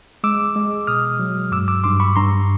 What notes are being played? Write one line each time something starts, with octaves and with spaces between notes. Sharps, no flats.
G#3 D6 E6
G#3
B2 D#6 F6
F#3
G2 D6 E6
D6 E6
G2 C6 D6
B5 C#6
G2 A#5 C6